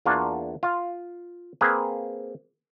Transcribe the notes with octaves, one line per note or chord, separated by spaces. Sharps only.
E2 A#3 D4 F4 F#4
F4 F5
A#3 C4 G#4 B4